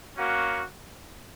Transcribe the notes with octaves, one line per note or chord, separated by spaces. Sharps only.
A#3 C#4 F#4